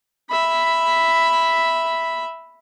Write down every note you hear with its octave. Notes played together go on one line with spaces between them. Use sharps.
E5 B5